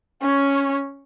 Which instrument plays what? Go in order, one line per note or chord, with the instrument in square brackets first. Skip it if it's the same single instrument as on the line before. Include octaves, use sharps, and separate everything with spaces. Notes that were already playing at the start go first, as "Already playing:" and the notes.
[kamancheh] C#4 C#5